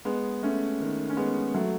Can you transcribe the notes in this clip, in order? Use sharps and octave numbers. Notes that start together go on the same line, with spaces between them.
G#3 B3
A3 C#4
D#3
C#4
G#3 B3
F#3 A3